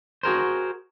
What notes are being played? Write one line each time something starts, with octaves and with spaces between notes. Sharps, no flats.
F#4 G#4 A#4 C5